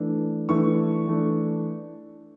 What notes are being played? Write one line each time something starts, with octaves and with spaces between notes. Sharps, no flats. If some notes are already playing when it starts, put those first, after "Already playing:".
Already playing: E3 A3 D4
E3 A3 D4 C#6
E3 A3 D4